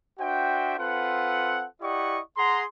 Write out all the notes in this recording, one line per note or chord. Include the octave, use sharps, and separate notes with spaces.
D4 F#4 C5 E5 G5
C4 F4 A4 B4 F#5
E4 G4 D5 D#5 F#5 C#6
G#4 F#5 A#5 C6